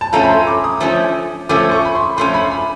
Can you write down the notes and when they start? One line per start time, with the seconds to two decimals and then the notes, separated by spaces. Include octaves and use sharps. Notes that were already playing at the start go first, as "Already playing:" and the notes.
0.01 A5
0.13 F3 A3 C#4 A#5
0.23 B5
0.30 C6
0.47 D6
0.64 D#6
0.80 F3 A3 C#4
1.49 F3 A3 C#4 D6
1.72 C#6
1.85 B5
1.95 C6
2.17 F3 A3 C#4 C6
2.34 B5
2.51 B5